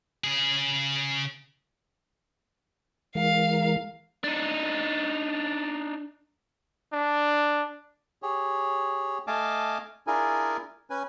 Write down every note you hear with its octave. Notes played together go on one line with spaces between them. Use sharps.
C#3 G#4
E3 G#3 A#4 F5
D4 D#4
D4
G4 G#4 C#5
A3 D#5 F5 G#5 A5 D6
D4 E4 F4 G#4 A#4 G#5
C#4 B4 G#5